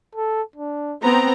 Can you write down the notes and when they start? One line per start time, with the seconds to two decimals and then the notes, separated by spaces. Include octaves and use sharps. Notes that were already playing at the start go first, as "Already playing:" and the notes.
0.15 A4
0.56 D4
1.04 B3 C4 C5 A#5